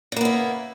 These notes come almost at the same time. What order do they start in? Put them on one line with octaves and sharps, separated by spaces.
C#3 A#3 B3 E4